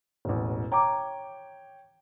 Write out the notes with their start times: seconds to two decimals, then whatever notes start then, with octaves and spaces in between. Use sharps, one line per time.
0.25 E1 A1
0.72 C#5 G5 A#5 D6